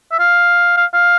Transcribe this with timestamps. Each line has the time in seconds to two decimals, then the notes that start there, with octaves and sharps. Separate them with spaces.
0.12 E5
0.19 F5
0.77 F5
0.94 F5